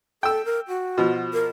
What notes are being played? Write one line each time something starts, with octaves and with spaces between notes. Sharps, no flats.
A4 G5 E6
A#4
F#4
B2 F3
A#4